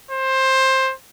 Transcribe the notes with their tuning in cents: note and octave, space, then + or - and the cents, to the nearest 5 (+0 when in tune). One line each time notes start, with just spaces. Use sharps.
C5 +15